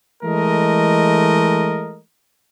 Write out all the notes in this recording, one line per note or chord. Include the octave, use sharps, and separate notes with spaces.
E3 G#3 A3 A#4 D#5